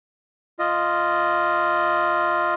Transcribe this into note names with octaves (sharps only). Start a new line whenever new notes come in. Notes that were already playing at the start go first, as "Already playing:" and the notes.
F4 D#5